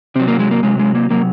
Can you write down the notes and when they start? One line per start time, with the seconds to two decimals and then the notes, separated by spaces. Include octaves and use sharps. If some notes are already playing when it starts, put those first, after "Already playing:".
0.15 C3 C4
0.20 F#3
0.28 A#3
0.39 G#3
0.51 A#3
0.63 C3 F#3 G#3
0.80 G#3
0.95 A#3
1.10 C3 F#3 A#3